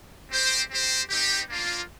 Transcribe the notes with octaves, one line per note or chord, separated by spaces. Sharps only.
C4 G4 C5 G5
C4 G4 C5
C4 D#4 G4
A#3 D4 F4